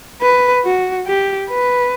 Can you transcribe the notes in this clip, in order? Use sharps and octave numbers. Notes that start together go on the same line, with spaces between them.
B4
F#4
G4
B4